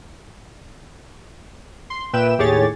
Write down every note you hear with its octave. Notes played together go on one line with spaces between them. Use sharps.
C6
A#2 B4 E5 G5 E7
D#2 A2 G4 G#4 C#5 A6